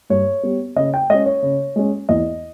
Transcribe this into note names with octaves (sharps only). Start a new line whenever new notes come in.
G2 C#5
G3 B3
C#3 D#5
G5
G#3 C#4 D#5
C#5
C#3
G#3 C#4
E2 D#5